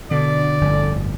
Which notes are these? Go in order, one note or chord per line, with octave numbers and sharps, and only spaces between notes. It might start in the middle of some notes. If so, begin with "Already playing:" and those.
B2 D3 D5
G1 F2 A2